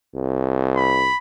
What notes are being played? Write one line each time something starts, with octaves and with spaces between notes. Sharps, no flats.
C2
B5